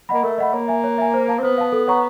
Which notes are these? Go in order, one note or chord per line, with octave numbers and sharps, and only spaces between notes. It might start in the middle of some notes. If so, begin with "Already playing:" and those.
A#3 D#5 F#5 B5
A3 A#4
D#5 F#5 B5
A#3 C#5
E5 G#5
C#5
E5 G#5
C5
F5 A5
C4
B3 C5
F5 A5
A4
C#5 F#5 A#5 C#6